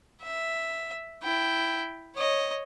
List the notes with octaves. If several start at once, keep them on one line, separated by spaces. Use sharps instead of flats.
E5
E4 G5
C#5 D#5